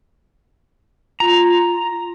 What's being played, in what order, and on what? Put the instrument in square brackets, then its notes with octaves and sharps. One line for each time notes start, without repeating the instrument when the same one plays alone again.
[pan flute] F4 [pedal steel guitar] A#5